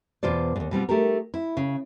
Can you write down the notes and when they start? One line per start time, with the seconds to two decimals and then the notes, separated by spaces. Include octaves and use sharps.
0.23 E2 B2 F4 C5 D5
0.56 D#2 G#2
0.71 B2 G3 C4 F4
0.89 A3 D#4 G4 A#4
1.34 E4
1.57 C#3